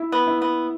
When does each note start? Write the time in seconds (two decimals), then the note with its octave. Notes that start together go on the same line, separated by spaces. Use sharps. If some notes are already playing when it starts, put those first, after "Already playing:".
Already playing: E4
0.12 B3
0.27 E4
0.42 B3